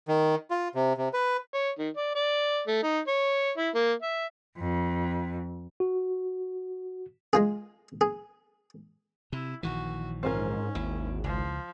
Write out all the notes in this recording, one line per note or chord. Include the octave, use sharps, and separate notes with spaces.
D#3
F4
C3
C3
B4
C#5
D#3
D5
D5
A3
D#4
C#5
E4
A#3
E5
F2
F#4
G#3 F4 G#4
G#4
C3 E4
A#1 D#3 E3 F#4
G#2 C4 C#4 F4 A#4
G#1 D#2 E4
C#2 F3